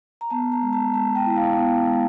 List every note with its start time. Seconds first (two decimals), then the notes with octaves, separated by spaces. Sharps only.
0.21 A#5
0.30 B3 A5
0.52 A#5
0.62 G#3
0.73 A5
0.94 G#3 A5
1.16 G5
1.26 E4
1.36 F5
1.57 B3
1.88 G#3